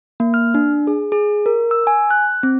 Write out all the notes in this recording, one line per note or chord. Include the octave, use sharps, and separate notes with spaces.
A#3
F6
D4
G#4
G#4
A#4
E6
G#5
F#6
C4